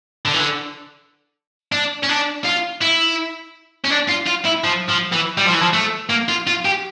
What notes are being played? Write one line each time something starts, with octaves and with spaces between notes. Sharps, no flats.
D3
E3
D3
D4
C#4
D4
F4
E4
C#4
D4
F4
F4
E4
F3
F3
E3
G3
F3
E3
F3
A3
A#3
F4
F4
G4